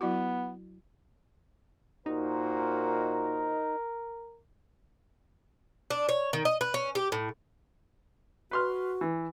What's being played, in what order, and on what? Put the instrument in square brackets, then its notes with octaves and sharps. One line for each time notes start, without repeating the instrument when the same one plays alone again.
[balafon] F#3 E4 F#4 [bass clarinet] B3
[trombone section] A#2 F#4 C5 [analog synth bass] D#4 [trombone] A#4
[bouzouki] D4
C#5
D#3
D#5
B4
C#4
G4
A2
[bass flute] F#4 [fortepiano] B4 C6 F6
[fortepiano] E3